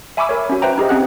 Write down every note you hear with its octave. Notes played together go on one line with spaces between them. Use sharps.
E5 G#5 B5 C#6 D6 E6
A#4 C#5
C#4 F#4
B4 C5 E5 G5 A#5
D#4 G4 G#4 D#5
C4 C#4 G#4 F#5 F#6